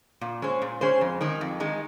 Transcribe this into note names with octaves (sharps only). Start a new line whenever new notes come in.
A#2
G#3 C#4 G#4 C5
A#2
G#3 C#4 G#4 C5
F2
D#3 G#3 D#4
F2
D#3 G#3 D#4